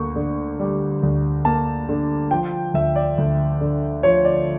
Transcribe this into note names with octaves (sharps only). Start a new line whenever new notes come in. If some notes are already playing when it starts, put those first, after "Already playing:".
Already playing: D2 A#3 C#6
D3
G3
D2
A#3 A5
D3
F3 G5
D2 E5
D5
D2
D3
F3 C#5
D5